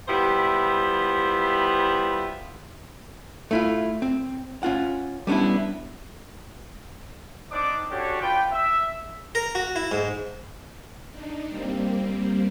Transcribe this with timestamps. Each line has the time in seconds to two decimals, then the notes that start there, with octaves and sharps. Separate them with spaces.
0.08 G3 B3 E4 F4 C5
3.51 A3 E4 F4
4.02 C4
4.63 C#4 F4 F#5
5.27 G3 B3 C#4 D4 E4
7.51 C4 D4 D#4 D5 D6
7.90 C#4 D4 F#4 G4 A4 C#5
8.21 D4 F4 B4 G5
8.52 E5
9.35 A#4
9.55 F#4
9.76 E4
9.92 G#2
11.11 D4 D#4
11.48 G3 A#3 C4